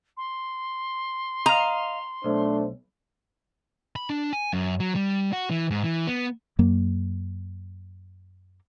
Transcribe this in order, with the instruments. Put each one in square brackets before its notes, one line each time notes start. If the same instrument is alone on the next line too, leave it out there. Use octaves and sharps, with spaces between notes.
[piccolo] C6
[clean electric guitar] D#5 F5 [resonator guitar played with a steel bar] A#5
[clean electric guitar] B1 [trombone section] A3 D4 C5
[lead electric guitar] B5
D4
G#5
F#2
F#3
G3
F#4
E3
G#2
E3
B3
[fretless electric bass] F#2 F#3 A#3